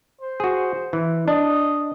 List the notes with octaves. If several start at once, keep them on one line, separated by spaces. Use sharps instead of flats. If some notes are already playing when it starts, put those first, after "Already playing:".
C5
F#4 G#4
E3
D4 D#5